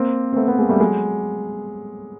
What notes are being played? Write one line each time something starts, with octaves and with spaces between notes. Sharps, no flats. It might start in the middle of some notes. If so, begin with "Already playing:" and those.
Already playing: A#3 C4
C4
A3 B3
A3 B3
G#3 A#3
G3 A3
F#3 G#3